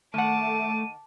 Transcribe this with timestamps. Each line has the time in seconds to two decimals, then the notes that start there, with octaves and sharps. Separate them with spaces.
0.14 D#3 A3 F#5 A5 D6 D#7